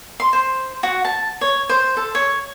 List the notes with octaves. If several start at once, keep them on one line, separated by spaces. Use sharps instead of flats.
C6
C5
F#4
A5
C#5
C5
A4
C#5